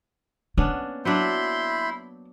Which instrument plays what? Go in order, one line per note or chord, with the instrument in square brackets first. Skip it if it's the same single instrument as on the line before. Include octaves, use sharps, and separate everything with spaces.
[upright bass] A#3 [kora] B3 C#4 D4
[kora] F#3 D4 [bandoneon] E4 C6 G6 [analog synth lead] B5